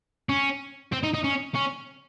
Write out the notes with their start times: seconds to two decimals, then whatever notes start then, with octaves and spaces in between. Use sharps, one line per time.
0.29 C#4
0.92 C4
1.03 D#4
1.14 D#4
1.24 C#4
1.55 C#4